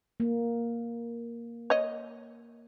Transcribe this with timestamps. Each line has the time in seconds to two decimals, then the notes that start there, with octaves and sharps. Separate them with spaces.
0.20 A#3
1.70 C#5 D#5